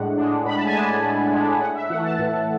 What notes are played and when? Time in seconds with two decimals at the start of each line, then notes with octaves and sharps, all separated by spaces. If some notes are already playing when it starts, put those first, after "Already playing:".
Already playing: A2 G#3 D4 F#5
0.17 G#3 D4
0.45 A2 B5
0.56 A5
0.65 G#5
0.74 G#3 D4 A5
1.03 A2
1.32 G#3 D4
1.60 A2 F#5
1.75 E5
1.89 E3 A3 F#5
2.03 A5
2.19 A2